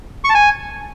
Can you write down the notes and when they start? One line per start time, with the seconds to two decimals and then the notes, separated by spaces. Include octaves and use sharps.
0.24 C#6
0.29 A5
0.35 G#5